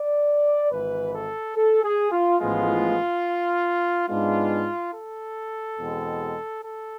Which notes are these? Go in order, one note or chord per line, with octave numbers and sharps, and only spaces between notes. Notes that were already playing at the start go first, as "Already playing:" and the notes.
Already playing: D5
G#1 G#2 E3 B4
A4
A4
G#4
F4
A1 A2 F3 G#3 B3 F4
G#2 G#3 B3 D4 F4
A4
E2 B2 G#3 C4
A4